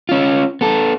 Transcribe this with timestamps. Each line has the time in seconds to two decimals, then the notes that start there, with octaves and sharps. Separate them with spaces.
0.09 C#4 F4
0.61 B3 A4